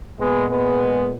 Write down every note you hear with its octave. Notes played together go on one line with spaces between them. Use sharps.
A#2 G#3 B3
G#3 B3